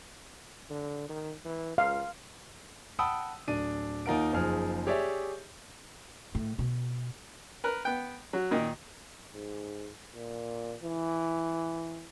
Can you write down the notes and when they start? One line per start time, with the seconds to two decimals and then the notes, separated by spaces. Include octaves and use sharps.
0.70 D3
1.09 D#3
1.45 E3
1.78 C#2 F5
2.99 F#5 G5 A5 B5 D#6 E6
3.48 D1 D4 D#7
4.06 D#2 D#4 F4 A#4 F#5 D7
4.33 F#1 F3 D#4 G#4 F6
4.87 G4 G#4 C#5 D5 E5
6.35 A2
6.59 B2
7.64 A#4 B4
7.85 B3 G5
8.33 F#3
8.51 A#2 D#3
9.34 G#2
10.14 A#2
10.83 E3